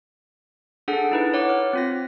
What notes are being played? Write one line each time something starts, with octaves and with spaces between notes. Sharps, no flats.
D4 G#4 A4 F#5
D#4 E4 B4
C#5 F#5 D6
F6
C4 F4 A#6